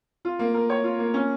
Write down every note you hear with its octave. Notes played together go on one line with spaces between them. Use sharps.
F4
A#3
A#4
C#5
F4
A#3
C#4